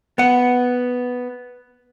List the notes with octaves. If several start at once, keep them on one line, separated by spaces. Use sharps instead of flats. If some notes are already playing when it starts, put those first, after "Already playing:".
B3 F#5